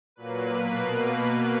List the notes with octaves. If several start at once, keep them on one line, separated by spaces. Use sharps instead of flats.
A#2 F#3 A#3 B4
B2 A#3